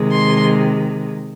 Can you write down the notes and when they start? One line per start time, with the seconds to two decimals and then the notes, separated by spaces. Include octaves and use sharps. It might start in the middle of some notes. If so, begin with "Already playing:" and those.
Already playing: C3 D#3 G#3
0.12 C6